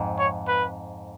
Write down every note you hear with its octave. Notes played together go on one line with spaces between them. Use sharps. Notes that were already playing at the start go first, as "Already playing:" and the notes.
Already playing: F2 G#2
C#5
B4